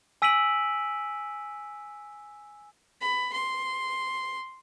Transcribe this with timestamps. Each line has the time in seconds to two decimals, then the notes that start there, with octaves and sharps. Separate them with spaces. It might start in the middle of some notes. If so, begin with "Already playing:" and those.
0.22 G#5 E6 B6 D7 D#7 F#7
3.01 B5
3.33 C6